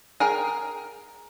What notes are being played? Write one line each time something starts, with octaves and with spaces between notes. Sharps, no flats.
G#4 A#4 G5